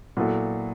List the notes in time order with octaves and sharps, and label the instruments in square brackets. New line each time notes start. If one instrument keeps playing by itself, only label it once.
[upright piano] A#2 F#3 B3 E4 A4